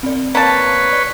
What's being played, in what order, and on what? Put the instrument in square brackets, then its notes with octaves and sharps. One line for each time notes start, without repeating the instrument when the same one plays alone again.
[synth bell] C4 D5
[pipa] A#3 A5 [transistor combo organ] B4 C#5
[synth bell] D5